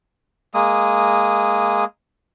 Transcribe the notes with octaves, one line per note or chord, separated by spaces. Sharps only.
G#3 A#3 D#6